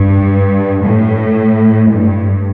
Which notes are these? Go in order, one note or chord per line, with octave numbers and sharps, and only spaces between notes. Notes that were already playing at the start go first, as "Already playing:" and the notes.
Already playing: G2
A2
G2